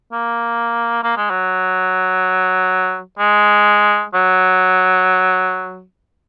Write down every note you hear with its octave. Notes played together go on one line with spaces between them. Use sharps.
A#3
A#3
G#3
F#3
G#3
F#3